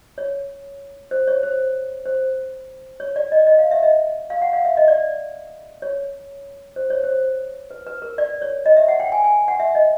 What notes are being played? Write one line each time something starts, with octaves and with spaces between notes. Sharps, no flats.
C#5
C5
C#5
C5
C5
C#5
D5
D#5
D#5
F5
E5
D#5
F5
F#5
F5
E5
D#5
D5
C#5
C5
C#5
C5
B4
B4
A#4
D5
C#5
D#5
E5
F#5
G5
G#5
G#5
F#5
E5
D#5